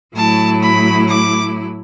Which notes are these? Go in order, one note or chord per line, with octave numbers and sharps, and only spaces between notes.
A2 F#3 A3 E4 A5
B5
D6